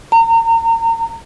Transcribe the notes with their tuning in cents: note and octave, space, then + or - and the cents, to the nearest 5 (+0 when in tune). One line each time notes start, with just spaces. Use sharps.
A#5 -35